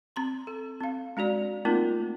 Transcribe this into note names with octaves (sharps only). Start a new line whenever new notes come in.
C4 A#5 C6
A4
C4 F5
G#3 D4 F#4 D5
A3 A#3 C4 D#4 F4 A#4